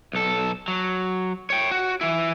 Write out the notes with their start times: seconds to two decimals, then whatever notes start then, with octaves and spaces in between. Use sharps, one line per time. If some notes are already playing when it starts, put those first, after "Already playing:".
0.13 B1 A4
0.68 F#3
1.50 C#5 G5
1.71 F#4
2.01 E3 E4